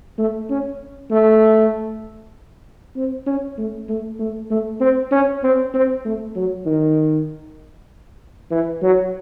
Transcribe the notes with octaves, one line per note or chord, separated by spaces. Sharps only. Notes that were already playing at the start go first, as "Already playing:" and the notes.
A3
C#4
A3
C4
C#4
A3
A3
A3
A3
C4
C#4
C4
C4
A3
F#3
D#3
E3
F#3